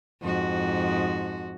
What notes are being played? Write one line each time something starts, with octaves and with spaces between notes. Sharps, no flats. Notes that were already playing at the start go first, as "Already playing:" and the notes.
F2 G#2 F#4